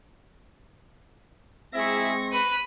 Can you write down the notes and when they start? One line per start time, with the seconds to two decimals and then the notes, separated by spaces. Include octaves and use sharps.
1.74 G#3 C4 E4 G#4 E5 C#6 A#6
2.32 B4 B5 D#7